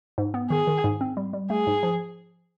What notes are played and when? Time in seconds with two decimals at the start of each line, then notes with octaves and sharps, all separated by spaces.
0.18 G#2
0.34 B3
0.50 D#3 G#4
0.67 D#3
0.84 G#2
1.01 C4
1.17 G3
1.33 G3
1.50 A3 G#4
1.67 G#2
1.83 F3